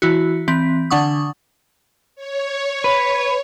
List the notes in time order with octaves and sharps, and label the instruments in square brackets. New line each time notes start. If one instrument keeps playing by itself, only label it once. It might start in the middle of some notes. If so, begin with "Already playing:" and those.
[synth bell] E3 E4 F#4
E3 C4 B6
D3 D4 F#5 C#6 D#6
[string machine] C#5
[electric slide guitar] B4